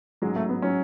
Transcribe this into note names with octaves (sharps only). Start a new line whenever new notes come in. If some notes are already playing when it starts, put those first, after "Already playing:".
A1 G#2 F#3 G#3
A3
B3
F#3 C#4